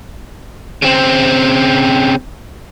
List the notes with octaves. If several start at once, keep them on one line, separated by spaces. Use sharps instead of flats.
C#3 C4